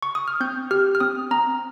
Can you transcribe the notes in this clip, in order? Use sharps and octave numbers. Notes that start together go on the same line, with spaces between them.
C#6
D#6
F6
C4 G6
G4 F6
F6
C4 D#6
C4 A#5